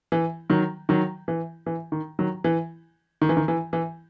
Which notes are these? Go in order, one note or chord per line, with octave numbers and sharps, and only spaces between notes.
E3
D#3 F#3
D#3 F#3
E3
E3
D#3
D#3 F#3
E3
D#3
E3
D#3
E3
E3